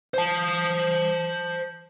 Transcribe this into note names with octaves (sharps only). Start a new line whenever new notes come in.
C5 A5